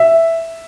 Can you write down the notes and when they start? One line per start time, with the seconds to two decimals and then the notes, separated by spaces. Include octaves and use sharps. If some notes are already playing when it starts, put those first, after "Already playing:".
Already playing: E5